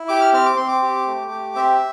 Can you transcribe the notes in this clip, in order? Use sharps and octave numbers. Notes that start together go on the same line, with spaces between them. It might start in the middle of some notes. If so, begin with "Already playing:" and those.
Already playing: E4
G4 D6
F6
C4 F6
D6
C4 C6
D6
G4
A3
G4
C4 E5